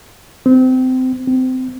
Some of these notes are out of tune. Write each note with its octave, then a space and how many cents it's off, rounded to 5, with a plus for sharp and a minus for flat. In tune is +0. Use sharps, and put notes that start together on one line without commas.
C4 -25
C4 -25